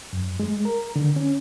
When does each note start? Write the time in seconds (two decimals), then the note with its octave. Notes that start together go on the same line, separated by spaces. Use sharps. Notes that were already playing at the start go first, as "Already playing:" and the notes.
0.13 F#2
0.40 G#3
0.65 A#4
0.96 D3
1.16 C#4